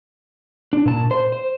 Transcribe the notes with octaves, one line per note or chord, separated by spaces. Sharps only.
D4
A#2 A5
C5
C5